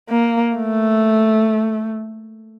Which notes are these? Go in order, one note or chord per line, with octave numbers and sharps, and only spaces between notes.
A#3
A3